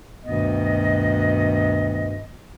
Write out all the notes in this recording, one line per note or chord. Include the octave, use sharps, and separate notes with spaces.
D2 G2 B2 D#3 B3 D#5